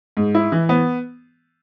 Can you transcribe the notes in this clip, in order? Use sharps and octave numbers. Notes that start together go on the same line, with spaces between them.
G#2
E4
E3
B3